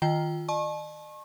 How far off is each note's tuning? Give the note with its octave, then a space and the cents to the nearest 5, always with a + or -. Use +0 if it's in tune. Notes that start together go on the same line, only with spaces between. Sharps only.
D#3 +0 F4 +0 G5 -5
D#5 -45 A5 -35 C#6 -35